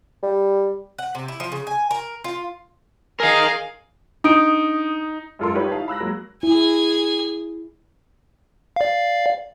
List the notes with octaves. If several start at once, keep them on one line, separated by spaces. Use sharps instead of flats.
G3
F#5
C3
E4
F3
C#3
G#5
A#4
F4
G#4 A#4 D#5 F5
D4 D#4 D#6 D7
F#2 G#3 F4 A4 A#4 C6
G3 D#4 F4 G4 B4 C#5
D#4 E4 F5 A5
B5 E6 F#6 A#6
F#3 G#3 A#3
E4 G#4 G#5
D5 F5